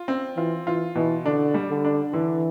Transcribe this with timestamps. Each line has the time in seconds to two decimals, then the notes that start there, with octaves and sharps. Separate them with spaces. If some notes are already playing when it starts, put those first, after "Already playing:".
Already playing: F4
0.08 C4
0.36 E3 F4
0.67 E3 F4
0.95 B2 E3
1.25 D3 D4
1.54 G3
1.70 D3
1.85 D4
2.13 D3 E3